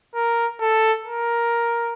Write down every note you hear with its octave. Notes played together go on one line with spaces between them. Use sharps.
A#4
A4
A#4